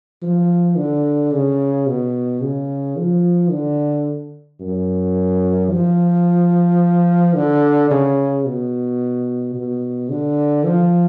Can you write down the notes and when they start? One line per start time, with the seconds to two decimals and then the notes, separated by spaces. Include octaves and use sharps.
0.22 F3
0.77 D3
1.32 C#3
1.87 B2
2.41 C#3
2.97 F3
3.51 D3
4.61 F#2
5.71 F3
7.35 D3
7.91 C#3
8.45 B2
9.55 B2
10.10 D3
10.64 F3